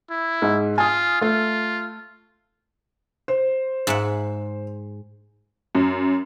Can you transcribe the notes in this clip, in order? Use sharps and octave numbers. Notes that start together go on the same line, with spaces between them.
E4
G#2
F4 G#5 D#6
A3 F4
C5
G#2 E5 F#5
F#2